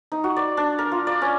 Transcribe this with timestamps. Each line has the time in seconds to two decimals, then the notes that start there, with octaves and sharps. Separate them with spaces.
0.12 D#4
0.24 F#4
0.36 D5
0.57 D4
0.79 A#4
0.92 F4
1.07 D5
1.21 C#4